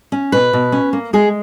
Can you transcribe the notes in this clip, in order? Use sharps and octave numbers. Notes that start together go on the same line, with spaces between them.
C#4
B2 B4
B2
C#4
A#3
G#3 G#4